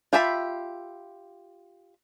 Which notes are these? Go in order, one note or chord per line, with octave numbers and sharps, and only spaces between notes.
F4 G4 E5 A5 B5